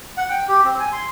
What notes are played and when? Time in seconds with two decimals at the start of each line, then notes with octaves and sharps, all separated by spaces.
0.17 F#5
0.30 G5
0.48 G4
0.64 C4
0.79 G#5
0.92 C6